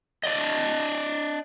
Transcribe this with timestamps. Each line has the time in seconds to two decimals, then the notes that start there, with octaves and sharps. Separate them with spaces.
0.23 D4 D5 D#5